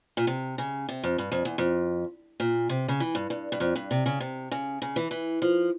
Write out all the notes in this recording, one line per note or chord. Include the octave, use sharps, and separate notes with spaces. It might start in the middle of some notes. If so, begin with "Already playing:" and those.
A#2
C3
C#3
C3
F2
G2
F2
E2
F2
A#2
C3
C#3
E3
G2
G2
G2
F2
G2
C3
C#3
C3
C#3
C#3
E3
E3
F3